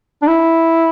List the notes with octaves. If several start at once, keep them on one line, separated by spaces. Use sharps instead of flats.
D4
E4